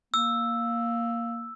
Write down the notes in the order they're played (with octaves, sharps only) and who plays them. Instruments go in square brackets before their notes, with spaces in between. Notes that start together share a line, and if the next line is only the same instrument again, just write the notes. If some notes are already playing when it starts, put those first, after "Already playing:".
[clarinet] A#3 [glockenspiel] E6